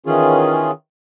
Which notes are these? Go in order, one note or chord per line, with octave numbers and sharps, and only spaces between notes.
D#3 E3 C#4 F4 G#4